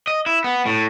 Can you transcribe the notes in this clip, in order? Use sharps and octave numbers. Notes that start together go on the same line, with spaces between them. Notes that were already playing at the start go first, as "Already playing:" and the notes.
D#5
E4
B3
A2